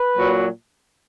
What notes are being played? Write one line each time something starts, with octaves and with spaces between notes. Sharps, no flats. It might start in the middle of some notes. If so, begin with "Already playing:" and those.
Already playing: B4
A#2 F#3